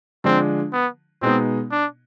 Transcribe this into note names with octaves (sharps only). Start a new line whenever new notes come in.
D3 F3 G#3 C4 D4
B3
B2 G#3 B3 C4 D#4
D4